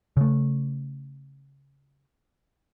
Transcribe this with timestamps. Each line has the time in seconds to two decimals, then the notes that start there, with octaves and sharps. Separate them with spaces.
0.17 C#3 A3